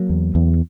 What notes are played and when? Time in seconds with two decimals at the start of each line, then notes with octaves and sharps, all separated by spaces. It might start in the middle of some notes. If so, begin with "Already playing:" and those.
Already playing: F#3 A#3
0.09 E2
0.35 E2